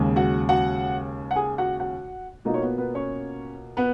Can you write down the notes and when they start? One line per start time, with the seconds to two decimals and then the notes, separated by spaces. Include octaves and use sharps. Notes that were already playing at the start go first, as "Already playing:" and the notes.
Already playing: D#2 C#3 G#3
0.16 F#4 F#5
0.49 F#4 F#5
1.31 F#5
1.36 G#4 G#5
1.58 F#4 F#5
1.79 F#4 F#5
2.45 B2 A#3 D#4 F4 D#5
2.54 C#5
2.62 B3 B4
2.78 B3 B4
2.94 C#4 C#5
3.77 B3 B4